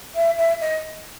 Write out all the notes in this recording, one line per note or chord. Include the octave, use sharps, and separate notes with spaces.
E5
E5
D#5